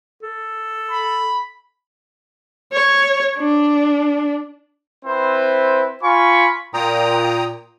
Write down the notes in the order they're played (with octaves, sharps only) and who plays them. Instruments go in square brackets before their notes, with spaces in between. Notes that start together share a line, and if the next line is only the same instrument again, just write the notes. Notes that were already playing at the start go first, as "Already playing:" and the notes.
[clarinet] A4
[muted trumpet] B5
[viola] C#5
D4
[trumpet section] C4 E4 B4 C5
F4 G#5 B5 C#6
[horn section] A#2 [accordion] G5 A#5 D#6